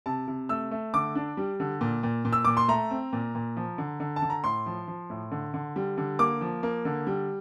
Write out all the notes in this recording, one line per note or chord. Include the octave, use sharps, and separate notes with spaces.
C3 A5
C3
A3 E6
A3
D3 D6
D4
G3
D3
A#2
A#2
A#2
E6
A#2 D6
C6
A3 A#5
C4
A#2
A#2
F3
D3
D3
A5
D3
A#5
A2 C6
F3
F3
A2
D3
D3
G3
D3
A#3 D6
F3
A#3
D3
G3